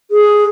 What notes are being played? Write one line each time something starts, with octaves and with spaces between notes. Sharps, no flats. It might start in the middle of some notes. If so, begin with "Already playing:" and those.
G#4